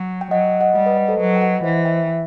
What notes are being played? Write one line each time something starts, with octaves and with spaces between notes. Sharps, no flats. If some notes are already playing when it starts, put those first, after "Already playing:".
Already playing: F#3
G5
F#3 D#5 F#5
D#5 F#5
G3 D#5 F#5
B4 D#5
B4 D#5
A4 C5
F#3 B4 D#5
G5
D#5 F#5
D#5
E3 C5 E5
E5 G5